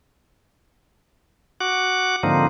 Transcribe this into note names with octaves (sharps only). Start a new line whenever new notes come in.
F#4 F#5 D6
G#2 D3 F3 A#3 C4 D#4